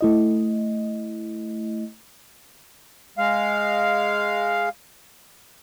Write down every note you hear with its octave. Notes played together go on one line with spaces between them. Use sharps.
A3 E4 D#5
G#3 F5